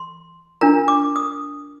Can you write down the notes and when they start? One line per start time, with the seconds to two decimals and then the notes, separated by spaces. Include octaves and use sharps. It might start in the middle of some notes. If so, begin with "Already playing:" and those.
Already playing: C6
0.61 D4 F4 A#4 A#5
0.88 D6
1.16 D#6